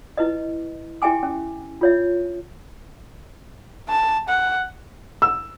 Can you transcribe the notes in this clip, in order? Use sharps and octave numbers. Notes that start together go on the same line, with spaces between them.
E4 B4 D#5
E4 G4 E5 G5 G#5 D6
C#4
F4 C#5 E5
A5
F#5
E6